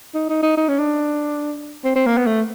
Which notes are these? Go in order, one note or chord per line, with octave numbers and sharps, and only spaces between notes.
D#4
D#4
D#4
D#4
C#4
D4
C4
C4
A#3
B3
A3